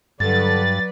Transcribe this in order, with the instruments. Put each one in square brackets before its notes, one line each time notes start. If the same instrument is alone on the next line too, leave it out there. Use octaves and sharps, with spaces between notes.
[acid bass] G2 [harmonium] D3 [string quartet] F#3 B4 D5 [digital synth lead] A6